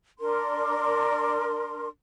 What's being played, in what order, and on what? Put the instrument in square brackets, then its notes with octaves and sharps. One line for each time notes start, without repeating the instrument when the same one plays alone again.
[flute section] D4 A#4 C6